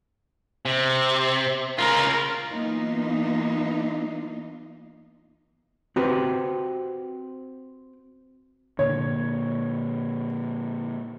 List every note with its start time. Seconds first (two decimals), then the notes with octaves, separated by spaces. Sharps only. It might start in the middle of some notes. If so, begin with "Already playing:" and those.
0.65 C3
1.79 C#3 F4 A#4
2.50 E3 F#3 A#3 B3 D#4 F4
5.96 C4 F#4 G4 B4 C5
8.79 A#2 D3 C#5